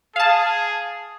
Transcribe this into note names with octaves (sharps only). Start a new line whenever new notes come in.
G#4 F5 A5